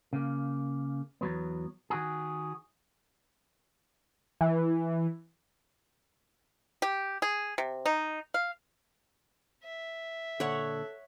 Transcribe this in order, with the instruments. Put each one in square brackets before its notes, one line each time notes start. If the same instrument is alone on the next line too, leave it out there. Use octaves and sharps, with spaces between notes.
[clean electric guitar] C#3 A#3
E2 F#3 B3
D#3 F#4 G#4
[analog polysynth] E3
[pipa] G4
G#4
C3
D#4
F5
[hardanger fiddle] E5
[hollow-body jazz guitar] A#2 D3 [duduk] A4 [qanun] C#5 F#5